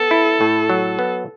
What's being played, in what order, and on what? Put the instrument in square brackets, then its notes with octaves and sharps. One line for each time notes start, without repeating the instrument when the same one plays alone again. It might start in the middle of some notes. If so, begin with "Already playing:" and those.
Already playing: [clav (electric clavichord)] B3 [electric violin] A4
[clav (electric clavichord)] E4
A2
F#3
B3